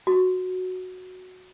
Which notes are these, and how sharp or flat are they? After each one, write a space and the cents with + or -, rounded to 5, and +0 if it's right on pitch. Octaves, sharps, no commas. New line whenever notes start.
F#4 -5